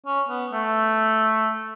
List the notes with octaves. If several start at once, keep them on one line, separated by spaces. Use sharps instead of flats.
C#4
B3
A3